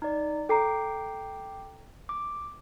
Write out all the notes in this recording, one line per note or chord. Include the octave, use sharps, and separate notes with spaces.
D#4 D5
A4 G5 A#5 D6 C7
D6